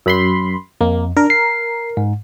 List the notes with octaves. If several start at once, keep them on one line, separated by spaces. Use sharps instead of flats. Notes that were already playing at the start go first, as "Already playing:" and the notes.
F#2 B5 C6
F2 A#3
D4 A#4
C7
G#2